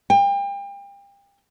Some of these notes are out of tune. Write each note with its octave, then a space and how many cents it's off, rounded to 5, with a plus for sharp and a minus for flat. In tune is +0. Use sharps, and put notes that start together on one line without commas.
G5 +35